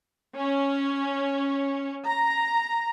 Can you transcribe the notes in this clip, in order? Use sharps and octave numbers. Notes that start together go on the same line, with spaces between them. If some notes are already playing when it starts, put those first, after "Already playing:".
C#4
A#5